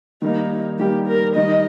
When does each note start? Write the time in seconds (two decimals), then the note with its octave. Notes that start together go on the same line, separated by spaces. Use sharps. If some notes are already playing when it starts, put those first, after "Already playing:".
0.22 D#3 G3 A#3 D#4
0.79 D#3 G3 A#3 G4
1.07 A#4
1.36 D#3 G3 D#4 D#5